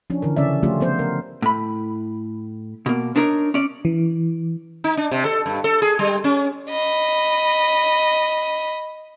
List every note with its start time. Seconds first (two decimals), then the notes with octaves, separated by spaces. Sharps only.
0.10 F3 C#4 D4
0.22 D3 E3 A#4
0.37 C#3 C#4 D5 E5
0.63 F3 A3 C#4 F4 G4
0.80 F3 B3 C5
0.99 A#4
1.42 A2 B5
2.86 B2 A#3
3.16 D4 D#4 A#4 C#5
3.54 C#4 D5
3.85 E3
4.84 D#4
4.97 D4
5.11 C3
5.25 A4
5.46 G2
5.64 A4
5.82 G#4
5.99 G3
6.24 C#4
6.70 D#5 B5